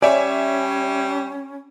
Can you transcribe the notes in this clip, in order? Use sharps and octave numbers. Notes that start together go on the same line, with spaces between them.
G3 C#4 C#5 D5 E5 G#5